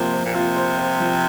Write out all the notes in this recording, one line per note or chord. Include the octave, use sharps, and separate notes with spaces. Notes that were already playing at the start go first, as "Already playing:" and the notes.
Already playing: C3 F3 A#3 C5
C5
A#2
C3 F4
C5
C5
F3